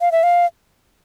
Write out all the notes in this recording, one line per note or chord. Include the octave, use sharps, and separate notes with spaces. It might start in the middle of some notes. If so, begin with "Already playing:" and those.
F5
E5
F5